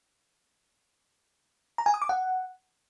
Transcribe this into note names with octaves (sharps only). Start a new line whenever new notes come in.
A#5
G#5
D#6
D6
F#5